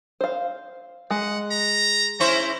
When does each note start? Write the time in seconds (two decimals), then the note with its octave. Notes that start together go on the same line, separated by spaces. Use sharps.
0.21 C5 F5
1.10 G#3 F#5
1.51 A#5
2.20 C#4 E4 C5 A#5